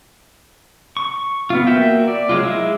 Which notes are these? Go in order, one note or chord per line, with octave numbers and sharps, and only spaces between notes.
C#6
B3 F4
A#3 F#4 E5 G5
D5
F#3 G#3 F4
G#3 E4